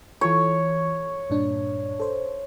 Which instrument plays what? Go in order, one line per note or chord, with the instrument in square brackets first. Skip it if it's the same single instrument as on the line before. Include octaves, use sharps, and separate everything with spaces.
[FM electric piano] E3 F4 A4 [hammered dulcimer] C#5
[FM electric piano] G2 A#2 D4
A4 C5